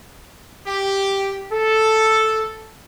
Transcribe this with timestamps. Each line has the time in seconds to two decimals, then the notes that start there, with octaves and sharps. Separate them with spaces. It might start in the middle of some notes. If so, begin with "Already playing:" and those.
0.67 G4
1.51 A4